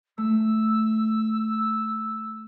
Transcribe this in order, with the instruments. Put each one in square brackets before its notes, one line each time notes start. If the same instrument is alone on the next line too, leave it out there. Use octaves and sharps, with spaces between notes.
[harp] A3 [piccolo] E6